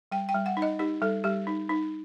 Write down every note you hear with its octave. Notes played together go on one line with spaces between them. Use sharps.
G3 G5
G5
G3
F#5
D#4
D#5
D#4 G4
G3 A4
G3 G4
D#4
D#4